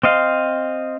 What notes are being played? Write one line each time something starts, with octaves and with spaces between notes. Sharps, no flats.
C4 D#5 F5